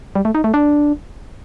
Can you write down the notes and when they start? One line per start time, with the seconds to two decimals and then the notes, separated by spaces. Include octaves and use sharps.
0.15 G3
0.25 A3
0.35 D#4
0.44 A3
0.54 D4